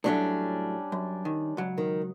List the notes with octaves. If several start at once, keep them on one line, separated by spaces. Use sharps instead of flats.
A2 F#3 G3 A3 C#4 D4
F#2
D#3
C#2 F#3
D#3